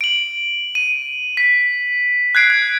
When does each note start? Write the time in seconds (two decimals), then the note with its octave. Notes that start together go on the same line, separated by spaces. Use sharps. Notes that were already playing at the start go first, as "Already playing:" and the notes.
0.01 D7 F#7
0.75 D#7
1.37 B6
2.35 F#6 G#6 C7 D7
2.50 G#6